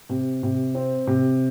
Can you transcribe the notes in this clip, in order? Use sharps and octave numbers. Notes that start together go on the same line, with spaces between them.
C3
C3
C4
C3